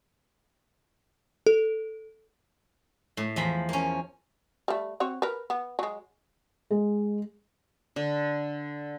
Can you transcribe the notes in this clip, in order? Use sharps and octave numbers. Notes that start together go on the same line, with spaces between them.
A4
A2
E2 F3 A#5 B5
A#3 C#4
G3 A3
C4 F#4 C#5
A#4 B4
B3
F#3 G#3
G#3
D3